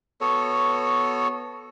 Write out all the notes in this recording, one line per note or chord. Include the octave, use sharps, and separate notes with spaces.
B3 F#4 A4 C#5